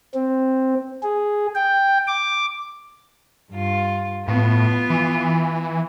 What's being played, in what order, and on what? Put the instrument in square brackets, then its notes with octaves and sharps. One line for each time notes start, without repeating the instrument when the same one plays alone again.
[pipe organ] C4
G#4
G5
D6
[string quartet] G2 F4
[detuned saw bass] A2 [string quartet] B3 F4
[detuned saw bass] E3